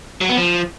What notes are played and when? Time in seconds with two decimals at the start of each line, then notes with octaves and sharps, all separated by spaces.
0.21 F#3
0.29 B3
0.37 F3